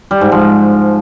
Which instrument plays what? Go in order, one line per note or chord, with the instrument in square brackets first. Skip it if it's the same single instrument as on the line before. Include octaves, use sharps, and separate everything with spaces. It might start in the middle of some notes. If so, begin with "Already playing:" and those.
[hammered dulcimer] G3
G#2
F3